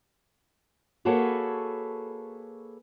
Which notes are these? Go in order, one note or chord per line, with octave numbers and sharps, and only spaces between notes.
A#3 F#4 G#4 A4 B4 C#5